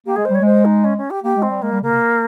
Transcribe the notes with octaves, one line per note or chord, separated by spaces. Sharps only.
A#3 G4
G#3 G#4
C5
G3 C#5
G#3 C5
D#4
C#4
C#4
G4
A#3 G4
G#3
C4
G3
G#3 A#3
G3
C#3 A#3
C3